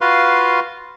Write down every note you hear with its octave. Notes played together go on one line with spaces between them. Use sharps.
F4 F#4 B4 F5 C6